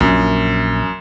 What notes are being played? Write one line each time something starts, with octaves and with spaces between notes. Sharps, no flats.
A#1 F#2